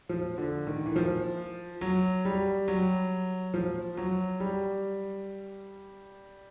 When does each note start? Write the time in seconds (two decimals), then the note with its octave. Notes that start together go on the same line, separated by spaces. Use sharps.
0.09 F3
0.38 D3
0.67 D#3
0.86 E3
0.96 F3
1.81 F#3
2.25 G3
2.68 F#3
3.54 F3
3.97 F#3
4.40 G3